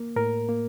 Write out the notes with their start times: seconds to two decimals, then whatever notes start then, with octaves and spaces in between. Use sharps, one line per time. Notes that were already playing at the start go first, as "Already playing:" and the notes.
Already playing: A#3
0.16 A2 A#4
0.49 A#3